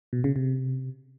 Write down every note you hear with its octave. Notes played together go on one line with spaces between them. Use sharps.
B2
C#3
C3